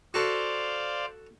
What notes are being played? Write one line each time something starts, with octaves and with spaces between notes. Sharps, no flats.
F#4 A4 C5 D5 F5